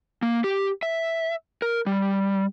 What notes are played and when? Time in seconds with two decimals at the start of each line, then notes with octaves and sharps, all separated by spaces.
0.22 A#3
0.44 G4
0.83 E5
1.62 A#4
1.86 G3